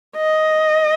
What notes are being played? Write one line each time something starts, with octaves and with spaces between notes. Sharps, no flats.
D#5